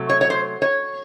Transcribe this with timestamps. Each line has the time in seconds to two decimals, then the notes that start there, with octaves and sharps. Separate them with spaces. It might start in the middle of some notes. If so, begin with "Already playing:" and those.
Already playing: C3 F#3 A3
0.10 C#5
0.21 C#5
0.30 C5
0.62 C#5